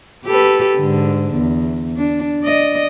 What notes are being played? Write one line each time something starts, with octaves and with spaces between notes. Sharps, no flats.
G4 A4 B4
G#2 D3
E2
D4
D5 D#5